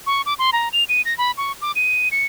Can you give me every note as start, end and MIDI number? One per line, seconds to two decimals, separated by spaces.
0.07 0.22 85
0.26 0.34 86
0.39 0.51 84
0.53 0.69 82
0.73 0.84 101
0.89 1.02 99
1.05 1.16 94
1.18 1.31 83
1.38 1.52 85
1.62 1.72 86
1.76 2.09 99
2.12 2.26 97